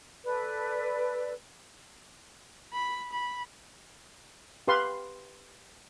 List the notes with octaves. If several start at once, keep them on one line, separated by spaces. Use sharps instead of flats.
A4 B4 D5
B5
B5
G4 B4 F5 C6